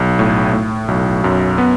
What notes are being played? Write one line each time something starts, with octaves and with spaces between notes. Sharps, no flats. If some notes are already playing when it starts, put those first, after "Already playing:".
Already playing: B1
A2
A2
B1
F#2
B3